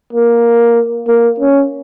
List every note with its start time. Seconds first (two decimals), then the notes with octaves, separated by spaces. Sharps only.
0.13 A#3
1.07 A#3
1.40 C#4